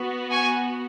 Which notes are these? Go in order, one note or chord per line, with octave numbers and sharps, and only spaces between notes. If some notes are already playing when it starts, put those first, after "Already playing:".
Already playing: B3 F#4
G#5 C#6